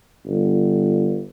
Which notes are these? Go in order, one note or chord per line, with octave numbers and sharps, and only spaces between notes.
G1